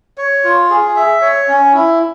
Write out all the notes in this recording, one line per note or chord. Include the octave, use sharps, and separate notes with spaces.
C#5
F4
G#4
E5
C#5
C#4
E4